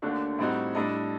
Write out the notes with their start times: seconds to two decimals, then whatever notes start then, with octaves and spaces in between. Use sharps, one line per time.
0.02 D#2 D3 A3 D4 F#4
0.39 A2 G3 C4 D#4 F#4
0.75 A2 G3 D4 A4 D#5